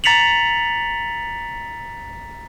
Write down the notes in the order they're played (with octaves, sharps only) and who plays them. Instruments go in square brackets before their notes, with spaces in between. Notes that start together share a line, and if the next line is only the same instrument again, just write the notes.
[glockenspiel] A#5 A6 B6 C#7 F7 F#7